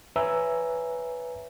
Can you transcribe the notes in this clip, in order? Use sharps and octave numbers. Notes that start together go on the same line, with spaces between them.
B4 C#5 E5 G#5 A#5 E6